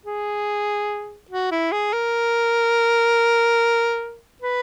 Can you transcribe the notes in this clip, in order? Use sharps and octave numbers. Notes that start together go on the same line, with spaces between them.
G#4
F#4
E4
G#4
A#4
B4